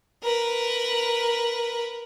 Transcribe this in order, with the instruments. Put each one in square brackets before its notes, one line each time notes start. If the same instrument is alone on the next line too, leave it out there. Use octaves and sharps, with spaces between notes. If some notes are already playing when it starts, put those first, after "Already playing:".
[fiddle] A#4 B4